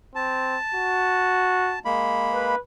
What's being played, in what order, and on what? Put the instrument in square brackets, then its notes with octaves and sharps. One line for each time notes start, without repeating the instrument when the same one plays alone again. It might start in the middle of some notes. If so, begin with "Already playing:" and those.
[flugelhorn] C4 [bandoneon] A5
[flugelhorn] F#4
[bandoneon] G#3 A#3 B5
[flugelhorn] B4